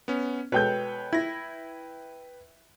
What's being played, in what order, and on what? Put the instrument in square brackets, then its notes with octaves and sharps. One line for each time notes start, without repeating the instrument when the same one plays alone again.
[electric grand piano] B3 C#4
[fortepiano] B2 G#3 A4 [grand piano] B4 G5 G6 [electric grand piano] C#5
[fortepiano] E4 [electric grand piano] G#6 A#6